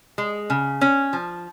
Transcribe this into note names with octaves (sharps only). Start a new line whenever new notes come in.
G#3
C#3
C#4
F3